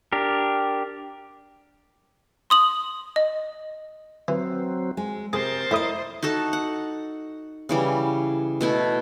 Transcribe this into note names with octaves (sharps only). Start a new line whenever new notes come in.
D4 G4 A#4
C6 D#6 F#7
D#5
E3 F#3 C4
G#3
C3 G#4 A#4 C5 A6
A2 E4 D#5 B5 D#6
D#4 F#4 A4 A5
F#5
C#3 E3 G3
B2 A3 E4